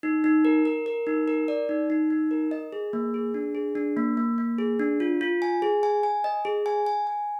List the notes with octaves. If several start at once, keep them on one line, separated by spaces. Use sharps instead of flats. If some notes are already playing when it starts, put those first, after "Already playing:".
D#4
D#4
A#4
A#4
A#4
D#4
A#4
D5
D#4
D#4
D#4
A#4
D#5
G#4
A#3
G#4
D4
G#4
D4
A#3
A#3
A#3
G#4
D4
F4
F4
G#5
G#4
G#5
G#5
D#5
G#4
G#5
G#5
G#5